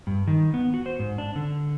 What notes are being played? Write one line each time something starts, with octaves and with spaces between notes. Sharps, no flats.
G2
D#3
B3
F#4
C5
G#2
D4
D3